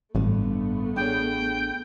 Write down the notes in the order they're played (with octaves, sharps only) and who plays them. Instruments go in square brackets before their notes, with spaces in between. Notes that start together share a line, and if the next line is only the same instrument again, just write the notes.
[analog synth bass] A1 [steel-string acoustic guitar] G2 D3 [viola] A3 B3
[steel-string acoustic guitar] D4 G#4 C#5 [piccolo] G5